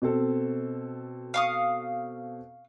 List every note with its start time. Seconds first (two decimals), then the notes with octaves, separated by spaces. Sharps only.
0.02 B2 C4 A4
1.34 F5 C#6 D#6